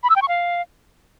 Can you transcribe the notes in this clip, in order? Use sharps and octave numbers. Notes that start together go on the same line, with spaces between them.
B5
E6
G5
C#6
F5